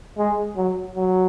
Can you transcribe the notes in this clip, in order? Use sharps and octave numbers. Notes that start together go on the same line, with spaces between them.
G#3
F#3
F#3